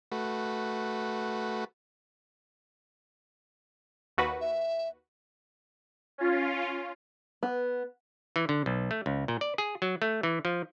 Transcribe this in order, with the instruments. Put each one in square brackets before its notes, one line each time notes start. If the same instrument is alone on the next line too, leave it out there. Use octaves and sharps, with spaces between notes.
[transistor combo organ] A3 F#4 B4
[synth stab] D#2 F#4 B4
[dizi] E5
[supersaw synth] C#4 F4
[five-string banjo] B3
[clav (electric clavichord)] E3
D3
B1
A3
C#2
A#2
D5
G#4
F#3
A3
E3
F3